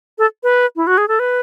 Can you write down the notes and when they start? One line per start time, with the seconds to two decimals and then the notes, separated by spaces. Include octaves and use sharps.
0.18 A4
0.43 B4
0.76 E4
0.87 F#4
0.98 G#4
1.08 A4
1.19 B4